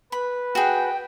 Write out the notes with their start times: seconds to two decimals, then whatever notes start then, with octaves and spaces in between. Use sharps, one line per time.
0.12 B4 B5
0.55 F#4 G#4 G5